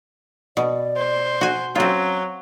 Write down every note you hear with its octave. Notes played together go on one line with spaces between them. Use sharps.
B2 D5
C5
F#4 G#5
F#3 C4 C#4 F4